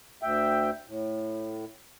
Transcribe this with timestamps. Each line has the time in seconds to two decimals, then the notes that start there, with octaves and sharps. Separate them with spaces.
0.22 D2 E5 G5
0.88 A2